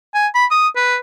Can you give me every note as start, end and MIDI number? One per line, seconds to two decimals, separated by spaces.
0.14 0.27 80
0.35 0.46 83
0.51 0.68 87
0.76 0.97 71